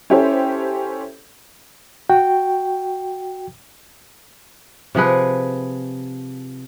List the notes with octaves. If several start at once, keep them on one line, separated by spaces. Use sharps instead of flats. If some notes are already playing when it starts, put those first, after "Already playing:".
C#4 E4 G4 A4 C5 C#5
F#4 G5
C3 F3 G#4 B4